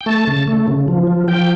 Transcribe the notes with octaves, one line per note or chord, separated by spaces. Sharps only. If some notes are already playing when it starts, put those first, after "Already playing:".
G5
A3 A5
C#3
A3
C#3
F3
F3
F3 G5